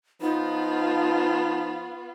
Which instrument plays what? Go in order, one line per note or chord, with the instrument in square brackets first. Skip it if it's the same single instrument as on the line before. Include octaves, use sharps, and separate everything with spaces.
[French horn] F3 [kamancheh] B3 F4 [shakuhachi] D#4